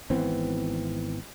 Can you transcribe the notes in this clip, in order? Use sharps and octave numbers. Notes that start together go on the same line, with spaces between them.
G#1 E3 B3 C4